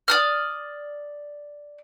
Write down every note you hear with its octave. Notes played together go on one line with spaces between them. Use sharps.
D5 D#6 F6